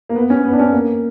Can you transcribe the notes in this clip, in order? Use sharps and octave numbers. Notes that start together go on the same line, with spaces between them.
A#3
B3
C#4
B3
D4
C#4
A#3